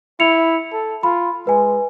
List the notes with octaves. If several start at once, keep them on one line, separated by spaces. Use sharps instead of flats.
E4 C#7 F7
A4
F4 B5
G#3 B4 G#5